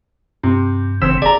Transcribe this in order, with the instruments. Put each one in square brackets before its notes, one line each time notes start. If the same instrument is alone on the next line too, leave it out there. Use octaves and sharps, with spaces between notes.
[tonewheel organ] G2 [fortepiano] C3
[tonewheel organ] F#1 C#3 E3 [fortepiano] C4 E6
[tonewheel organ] G#4 [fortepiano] D5 A#5